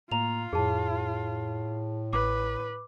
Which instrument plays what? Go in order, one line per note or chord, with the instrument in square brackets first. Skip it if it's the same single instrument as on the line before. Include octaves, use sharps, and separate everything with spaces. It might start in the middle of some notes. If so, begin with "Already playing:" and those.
[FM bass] A2 [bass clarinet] A#3 [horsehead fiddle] F4 [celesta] A#5 F7
[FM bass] F2 [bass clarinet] A2 [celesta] G#4 A5
[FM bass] A1 [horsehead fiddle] B4 [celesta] D6